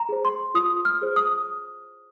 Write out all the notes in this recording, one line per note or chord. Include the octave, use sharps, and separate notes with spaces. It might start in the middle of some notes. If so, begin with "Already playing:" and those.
Already playing: A#5
G#4 C5
C6
F4 D#6
F6
G#4 C5
D#6